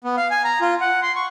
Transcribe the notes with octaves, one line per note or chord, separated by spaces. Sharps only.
B3
F5
G#5
A#5
F4
F#5
C6
C#6